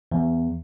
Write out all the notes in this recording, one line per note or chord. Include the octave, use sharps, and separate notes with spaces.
E2